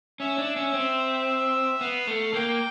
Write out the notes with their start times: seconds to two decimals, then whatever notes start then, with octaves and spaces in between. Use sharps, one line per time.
0.20 C#4 E5
0.38 D4
0.56 C#4
0.74 C4
1.80 B3 F5
2.07 A3
2.34 A#3 G5